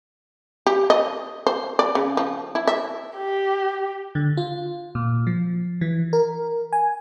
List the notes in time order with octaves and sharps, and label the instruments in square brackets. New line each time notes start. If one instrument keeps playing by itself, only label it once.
[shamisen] G4
D#5
C5
D5
C#3
F3
E4
E5
[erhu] G4
[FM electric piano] D3
F4
A#2
F3
E3
A#4
G#5